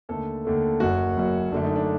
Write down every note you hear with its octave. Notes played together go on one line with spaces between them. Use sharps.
D#2 D3 A3 A4
D#2 D3 A3
F#1 F#2 F#3 F#4
F#1 F#2 F#3
F#2 D3 A3 D4
D#4
D4